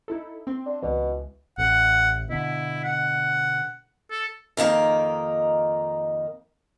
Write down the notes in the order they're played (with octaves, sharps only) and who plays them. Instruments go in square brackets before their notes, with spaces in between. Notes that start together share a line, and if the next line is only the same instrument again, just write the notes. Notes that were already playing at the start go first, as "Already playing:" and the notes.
[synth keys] D#4 E4 A4
C4 C6
[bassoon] D4
[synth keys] C#2 E3 [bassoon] B2
[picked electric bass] A1 [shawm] F#5
[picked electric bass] B2 D3 [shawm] E4
[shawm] F#5
A4
[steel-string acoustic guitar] F2 D#3 A#3 D#4